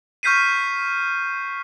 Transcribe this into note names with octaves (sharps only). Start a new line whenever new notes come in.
C#6 F6 G6 B6 C7 D#7